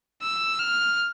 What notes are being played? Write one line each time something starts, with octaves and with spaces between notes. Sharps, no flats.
E6
F6